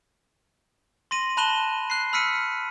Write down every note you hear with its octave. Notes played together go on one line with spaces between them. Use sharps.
C6 A#6 D#7 F#7
A5 B5 F#6 D#7 E7 G7
F#6 C7
B5 E6 F6 B6 C#7 D#7